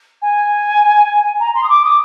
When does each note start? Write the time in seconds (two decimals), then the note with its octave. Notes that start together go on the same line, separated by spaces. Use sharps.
0.22 G#5
1.40 A#5
1.54 C6
1.64 D#6
1.69 D6
1.85 D#6